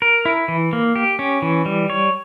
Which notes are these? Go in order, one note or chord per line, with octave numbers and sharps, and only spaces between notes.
A#4
E4
E3
A#3
G4
C#4
E3
G3
C#5